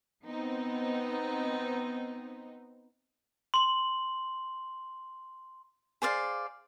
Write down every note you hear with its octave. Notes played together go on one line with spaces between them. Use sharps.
B3 C4 D#4
C6 F#7
G#4 C5 D5 F5